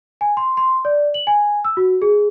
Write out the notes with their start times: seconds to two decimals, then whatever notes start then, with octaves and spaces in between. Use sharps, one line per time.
0.21 G#5
0.37 C6
0.57 C6
0.85 D5
1.14 F#7
1.27 G#5
1.65 E6
1.77 F#4
2.02 G#4